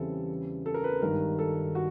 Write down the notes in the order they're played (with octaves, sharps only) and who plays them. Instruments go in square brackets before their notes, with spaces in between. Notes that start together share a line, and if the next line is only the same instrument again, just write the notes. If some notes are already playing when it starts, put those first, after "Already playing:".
Already playing: [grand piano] E2 C#3 E3 G3 C4 [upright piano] A4
[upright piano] A4
A#4
B4
[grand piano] G#1 G2 D#3 [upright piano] A#4
[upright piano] A4
F#4